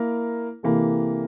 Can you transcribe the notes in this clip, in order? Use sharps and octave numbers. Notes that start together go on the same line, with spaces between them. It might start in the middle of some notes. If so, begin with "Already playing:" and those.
Already playing: A#3 E4 A#4
C3 E3 A#3 E4 A4